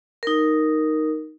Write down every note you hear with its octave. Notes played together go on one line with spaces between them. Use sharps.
D#4 A#4